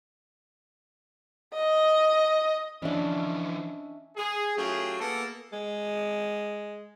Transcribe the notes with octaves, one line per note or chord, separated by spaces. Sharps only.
D#5
E3 F3 C#4 D4 D#5 E5
G#4
F#3 A3 C#4 F4 G4 G#4
A#3 B3 G#4 A4
G#3